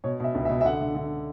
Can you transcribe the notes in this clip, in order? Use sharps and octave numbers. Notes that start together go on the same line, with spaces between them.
B2 C#5
B2 E5
C#2
E5
B2
E5
D3 F#5
D3
D3